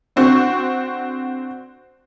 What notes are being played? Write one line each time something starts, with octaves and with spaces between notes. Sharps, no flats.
D3 C4 F#4 C#6